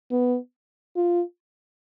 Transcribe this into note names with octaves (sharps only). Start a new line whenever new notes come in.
B3
F4